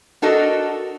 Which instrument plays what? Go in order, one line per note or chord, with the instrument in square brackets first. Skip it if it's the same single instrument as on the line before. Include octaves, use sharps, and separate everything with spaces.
[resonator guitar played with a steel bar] D4 F#4 A4 A#4 D#5